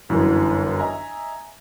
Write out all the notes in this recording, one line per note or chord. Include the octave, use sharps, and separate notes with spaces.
G1 F#2 E3
D#5 E5 G#5 A#5